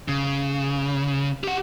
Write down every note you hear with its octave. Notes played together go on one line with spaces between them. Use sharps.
C#3
G4 F#5